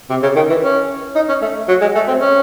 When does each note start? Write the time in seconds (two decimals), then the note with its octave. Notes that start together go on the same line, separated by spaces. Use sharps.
0.10 C3
0.22 C#3
0.36 D#3
0.49 E3
0.62 C#4
1.15 D#4
1.29 C#4
1.42 A3
1.68 F#3
1.81 G#3
1.95 A3
2.08 C4
2.20 C#4